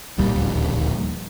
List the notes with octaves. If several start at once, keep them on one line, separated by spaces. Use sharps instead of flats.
D1 A#1 D#2 G3